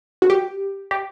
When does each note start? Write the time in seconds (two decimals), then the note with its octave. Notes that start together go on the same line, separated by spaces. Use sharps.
0.22 F#4
0.30 G4
0.91 G4